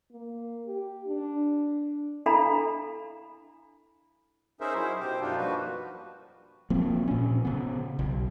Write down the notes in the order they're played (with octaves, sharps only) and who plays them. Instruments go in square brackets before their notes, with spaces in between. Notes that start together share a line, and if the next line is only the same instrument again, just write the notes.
[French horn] A#3
G4
D4
[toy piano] D4 E4 A4 F5 A#5 B5
[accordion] C#4 D#4 G#4 A#4 C5 E5
F#3 E4 C5
B2 G4 C5
F#2 B2 F3 D4 D#4 F4
F3 G3 A#3 F#4 B4
[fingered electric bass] F3 A#3 C4
A#2 C#4
C#3 B3
B1